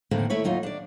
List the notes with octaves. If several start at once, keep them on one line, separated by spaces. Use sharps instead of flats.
F2 A2 D3 D#3 A#3 C4
A3 E4 C#5
D#2 F#3 D#4 F4
D4 D5